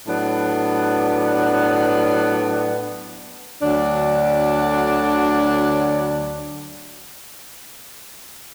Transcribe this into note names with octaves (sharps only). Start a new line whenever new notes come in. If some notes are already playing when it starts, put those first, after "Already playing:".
A2 F#3 B3 D4
D2 D3 F#3 D4